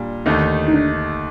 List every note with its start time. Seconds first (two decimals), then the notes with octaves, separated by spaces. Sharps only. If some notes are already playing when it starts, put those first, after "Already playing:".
Already playing: A#2 G3 D4
0.26 D#2 D3 A3 D#4
0.68 D#4
0.74 D4